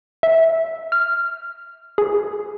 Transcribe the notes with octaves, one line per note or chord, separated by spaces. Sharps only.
E5
F6
G#4